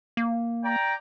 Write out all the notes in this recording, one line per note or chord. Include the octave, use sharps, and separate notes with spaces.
A#3
D5 G5 A#5